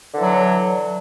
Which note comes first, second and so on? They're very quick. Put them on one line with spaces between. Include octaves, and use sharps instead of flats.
D3 E3 F#3